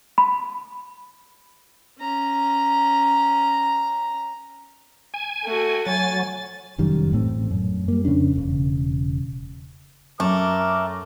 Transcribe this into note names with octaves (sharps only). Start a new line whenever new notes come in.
B5
C#4 A#5
G#5
A3 F#4
F#3 G#5 A6
F1 F#2 D#3 G3
A1 A2 A3 C4
F#2
G3 A#3
F2 C#3 C#4 D4
E1 C#3
F#2 A3 A#4 D6